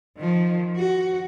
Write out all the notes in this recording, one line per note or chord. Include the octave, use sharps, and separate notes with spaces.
D#3 F3
F#4